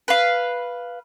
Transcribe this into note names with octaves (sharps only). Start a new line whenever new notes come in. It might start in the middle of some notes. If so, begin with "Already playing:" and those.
B4 F5